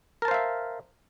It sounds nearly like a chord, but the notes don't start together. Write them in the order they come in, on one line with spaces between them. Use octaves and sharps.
A#4 A5 C5 F5 E5